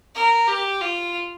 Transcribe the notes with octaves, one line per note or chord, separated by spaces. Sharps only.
A#4
G4
F4